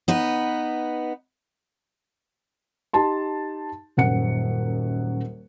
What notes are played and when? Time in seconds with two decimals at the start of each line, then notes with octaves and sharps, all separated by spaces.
0.08 B3 D#4 B4
2.93 D#4 G4 A5 C6
3.97 D#1 F#2 F#5 C#7